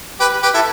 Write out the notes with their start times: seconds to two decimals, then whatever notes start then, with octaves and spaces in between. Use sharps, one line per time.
0.20 G4 B4
0.43 G4 B4
0.54 E4 A4